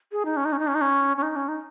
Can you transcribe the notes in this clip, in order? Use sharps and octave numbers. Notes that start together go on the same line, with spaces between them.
G#4
D#4
C#4
D#4
C#4
D#4
C#4
D#4
C#4
C#4
D#4
C#4
D#4